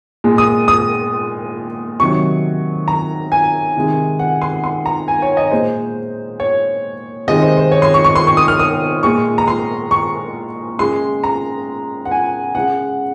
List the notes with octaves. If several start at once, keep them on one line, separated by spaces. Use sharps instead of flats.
A#2 G#3
D#6
D#6
C3 D#3 F#3 C#6
A#5
G#5
C3 D#3 G#3
F#5
C6
C6
A#5
G#5
C#5
D#5
A#2 G#3 C5
C#5
C3 D#3 G#3 D#5
C5
C5
C#5
C6
C#6
C#6
C6
C#6
D#6
F6
D#6
A#2 G#3 C#6
A#5
C6
C#6
C#3 G#3 C6
A#5
F#5
G#5
C#3 G#3 F#5